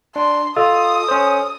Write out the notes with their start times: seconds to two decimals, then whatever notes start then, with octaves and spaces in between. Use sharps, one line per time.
0.16 D4 C6
0.56 F4 A4 D#5 D#6 E6
1.08 C#4 C5